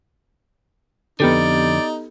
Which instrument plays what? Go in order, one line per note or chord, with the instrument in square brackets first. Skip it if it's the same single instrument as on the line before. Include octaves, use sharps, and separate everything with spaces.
[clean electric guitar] F2 D3 [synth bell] B3 G4 A4 [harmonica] D#4 [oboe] D5